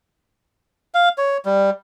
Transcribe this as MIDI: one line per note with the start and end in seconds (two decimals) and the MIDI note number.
0.94 1.09 77
1.18 1.38 73
1.45 1.70 55